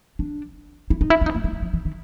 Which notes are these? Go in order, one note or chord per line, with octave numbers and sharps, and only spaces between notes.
D4
E4
D#4
E4
E4
D#4
A#3
A3
F#3
F3
E3
D#3